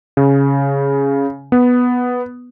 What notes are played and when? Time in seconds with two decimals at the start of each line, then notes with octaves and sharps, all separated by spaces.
0.17 C#3
1.52 B3